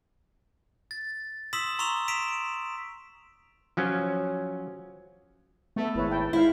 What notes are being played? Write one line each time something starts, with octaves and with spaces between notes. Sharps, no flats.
A6
C6 D#6 E6 B6 E7 F#7
A#5 C6 C#6 D#6 E6 F7
C6 B6 D7 E7 F7
F3 F#3 C#4
A3 B3 A4 E5
G#1 E4 B4 C#5
E4 G5 A5
G#3 E4 C5 F5